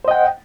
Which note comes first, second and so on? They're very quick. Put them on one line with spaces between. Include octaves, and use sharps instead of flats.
C5 D#5 G5 F#5